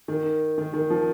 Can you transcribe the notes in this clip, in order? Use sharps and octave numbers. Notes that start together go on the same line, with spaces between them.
D#3
D#3
D#3
F3